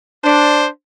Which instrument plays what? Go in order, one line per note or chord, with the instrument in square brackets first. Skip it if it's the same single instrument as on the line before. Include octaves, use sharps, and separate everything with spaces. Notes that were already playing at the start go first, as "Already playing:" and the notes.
[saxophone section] D4 [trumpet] C5